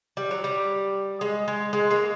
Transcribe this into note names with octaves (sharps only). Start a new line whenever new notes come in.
G3
F#3
G3
G#3
G#3
G#3
G#3 A#3